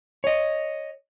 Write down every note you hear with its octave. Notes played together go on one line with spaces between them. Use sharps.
C#5 D#5